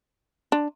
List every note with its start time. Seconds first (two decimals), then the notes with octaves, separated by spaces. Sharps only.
0.52 D4